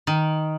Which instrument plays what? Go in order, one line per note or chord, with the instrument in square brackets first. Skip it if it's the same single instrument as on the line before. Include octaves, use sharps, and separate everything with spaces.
[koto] D#3